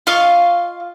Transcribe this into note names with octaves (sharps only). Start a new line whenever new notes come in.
F4 D#5 F5 C#6